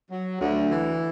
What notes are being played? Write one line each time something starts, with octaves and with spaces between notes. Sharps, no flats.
F#3
D2
E3